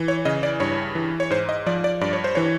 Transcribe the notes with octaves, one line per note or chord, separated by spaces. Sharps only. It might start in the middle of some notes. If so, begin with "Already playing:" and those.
Already playing: E3
C#5
C#3 D#5
D5
G2 C#5
E3
C#5
G#2 C5
D#5
F3 D5
D5
G2 D5
C#5
C5
E3 C#5